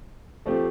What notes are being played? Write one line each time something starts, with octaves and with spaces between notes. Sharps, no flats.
F3 A3 C4 G4